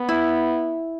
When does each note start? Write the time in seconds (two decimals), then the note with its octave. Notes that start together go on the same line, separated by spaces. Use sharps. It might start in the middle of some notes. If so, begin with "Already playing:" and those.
Already playing: B3
0.09 E4